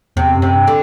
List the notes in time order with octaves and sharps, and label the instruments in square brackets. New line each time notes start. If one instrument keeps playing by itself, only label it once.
[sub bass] E2 [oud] C3
[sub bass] F#2
[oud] C3
[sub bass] G2
[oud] D3